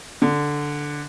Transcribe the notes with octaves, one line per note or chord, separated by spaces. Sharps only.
D3